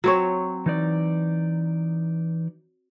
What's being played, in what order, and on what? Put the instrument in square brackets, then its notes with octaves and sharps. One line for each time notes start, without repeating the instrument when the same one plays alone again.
[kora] F#3 C4 C#5
[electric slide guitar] E3 D#4 D5